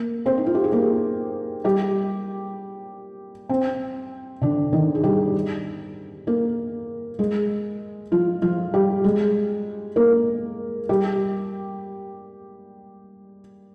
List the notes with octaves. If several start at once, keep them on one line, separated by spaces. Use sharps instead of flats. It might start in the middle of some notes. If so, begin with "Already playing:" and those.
Already playing: A#3 A#4
C4 C5
D#4
F4
G4
G#4
A#3 A#4
G3 G4
C4
D3 D4
D#3 D#4
G#4
G3 G4
A#3 A#4
G#3 G#4
F3 F4
F3 F4
G3 G4
G#3 G#4
A#3 A#4
G3 G4